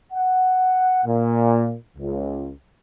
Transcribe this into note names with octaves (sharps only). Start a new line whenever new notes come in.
F#5
A#2
C#2